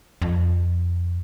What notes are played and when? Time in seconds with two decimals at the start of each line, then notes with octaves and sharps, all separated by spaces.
0.22 F2